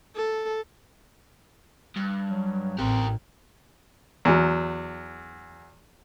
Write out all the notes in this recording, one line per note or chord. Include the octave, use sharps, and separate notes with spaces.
A4
G2
F#3
A1 C4 G4 A#4
E2 F#3